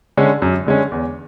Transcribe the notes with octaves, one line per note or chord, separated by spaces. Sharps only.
D3 G#3 C#4
F#2
D3 G#3 C#4
E2